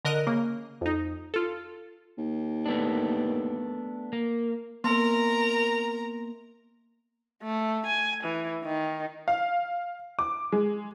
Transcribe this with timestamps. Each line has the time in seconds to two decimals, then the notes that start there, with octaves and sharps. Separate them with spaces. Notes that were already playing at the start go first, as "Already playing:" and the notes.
0.05 D3 A#4 D#5 F#6
0.27 C#3 A#3
0.81 F2 D#4
1.34 F4 A4
2.18 D#2
2.66 A3 B3 D4
4.13 A#3
4.84 A#3 B3 A#4 A#5 C6
7.42 A3
7.86 G#5
8.24 E3
8.63 D#3
9.28 F5
10.19 D6
10.52 G#3